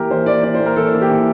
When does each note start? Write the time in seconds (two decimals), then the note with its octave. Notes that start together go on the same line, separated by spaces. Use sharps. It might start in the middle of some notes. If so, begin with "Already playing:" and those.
Already playing: E3 A#3 G4 A#4
0.10 E3 C5
0.26 A#3 D5
0.43 E3 D5
0.54 C5
0.60 A#3
0.66 A#4
0.76 E3 A4
0.93 A#3
1.02 G4
1.10 E3